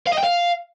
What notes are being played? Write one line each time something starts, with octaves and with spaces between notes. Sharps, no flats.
F5
D#5
G5
F5